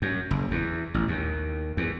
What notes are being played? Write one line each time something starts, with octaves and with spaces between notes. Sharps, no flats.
F#2
F#1
E2
A1
D#2
E2